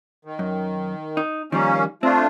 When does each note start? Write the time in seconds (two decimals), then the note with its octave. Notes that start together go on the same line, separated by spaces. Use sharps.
0.25 D#3
0.39 F#2
1.17 D#4
1.52 D#3 F3 G3 A#3 C#4
2.03 A3 C4 D4 F4